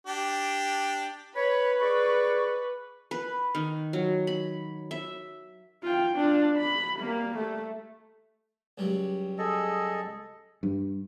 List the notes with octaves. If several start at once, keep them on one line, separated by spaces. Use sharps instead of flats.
D4 G4
B4 C#5 B5
G#4 D5 C#6
B4
D#3
F#3
B5
E5
F4 G5
D4 F4
B5
G3 A#3
A3
C#2 F#3 G3
G#4 A4 D#5
G2